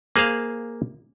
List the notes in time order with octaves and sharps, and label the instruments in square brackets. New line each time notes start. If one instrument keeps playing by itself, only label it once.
[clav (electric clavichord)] A#3 G#4 C5 F5